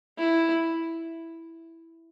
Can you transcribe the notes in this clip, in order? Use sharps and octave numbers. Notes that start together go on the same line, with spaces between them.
E4